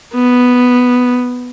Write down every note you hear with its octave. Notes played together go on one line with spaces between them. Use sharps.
B3